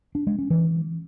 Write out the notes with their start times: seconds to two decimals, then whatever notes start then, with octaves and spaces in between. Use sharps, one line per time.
0.15 D4
0.27 G#3
0.39 C#4
0.50 E3